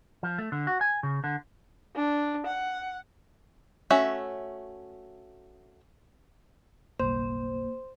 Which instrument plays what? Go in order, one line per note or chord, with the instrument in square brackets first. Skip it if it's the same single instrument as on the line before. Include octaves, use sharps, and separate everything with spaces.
[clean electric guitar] F3
A3
D3
F#4
G#5
C#3
D3
[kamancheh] D4
F#5
[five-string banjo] A3 C#4 F#4 E5
[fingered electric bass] F#1 B1 G3 [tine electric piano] A#3 [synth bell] C5 [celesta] C6